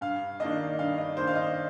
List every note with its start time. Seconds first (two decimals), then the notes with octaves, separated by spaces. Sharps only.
0.01 G2 F5
0.40 D#3 A#3 D4 D#5
0.79 G2 F5
0.98 D#5
1.17 D#3 A#3 D4 C5
1.27 F5
1.35 D#5